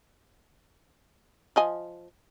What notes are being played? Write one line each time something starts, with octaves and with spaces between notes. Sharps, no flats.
F3 D#5 G#5